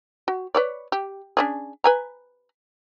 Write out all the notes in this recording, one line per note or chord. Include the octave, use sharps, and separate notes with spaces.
F#4
B4 C#5 D5
G4
C#4 D4 G#4
B4 G#5 A#5